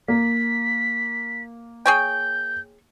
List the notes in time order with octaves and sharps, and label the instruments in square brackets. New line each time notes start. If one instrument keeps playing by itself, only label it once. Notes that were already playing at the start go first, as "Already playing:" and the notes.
[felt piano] A#3 [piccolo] B6
[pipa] G#4 C#5 G5 [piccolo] G6